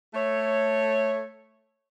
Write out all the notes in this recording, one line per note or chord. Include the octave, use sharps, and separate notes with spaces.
A3 C#5